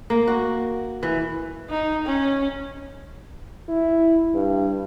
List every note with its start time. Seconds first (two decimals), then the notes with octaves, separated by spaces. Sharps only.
0.10 A#3
0.27 F#4
1.03 E3
1.70 D#4
2.06 C#4
3.68 E4
4.35 G2